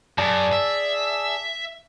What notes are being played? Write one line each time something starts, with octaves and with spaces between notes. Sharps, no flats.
F#2 G#4 D5 A5
E5